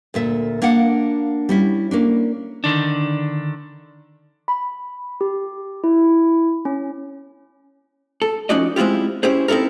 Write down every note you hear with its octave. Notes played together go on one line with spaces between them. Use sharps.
D2 A#2 E5
A#3 D4 F5 F#5
G3 C#4 E4
A#3 C#4 D4
D3 D#3 D4
B5
G4
E4
C#4
A4
F2 C#4 D#4 F#4 D5 D#5
G#3 C4 E4 F4 G4
C#4 E4 G4 G#4 C5
C4 D#4 E4 A4 A#4